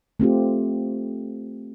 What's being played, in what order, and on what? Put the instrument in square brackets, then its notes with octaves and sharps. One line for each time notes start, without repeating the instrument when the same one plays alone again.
[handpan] A3 C4 F4 G4